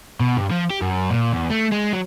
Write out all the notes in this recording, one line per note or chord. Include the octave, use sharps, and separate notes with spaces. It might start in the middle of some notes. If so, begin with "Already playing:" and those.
B2
G2
F3
G4
F#2
A#2
E2
A3
G#3
F#3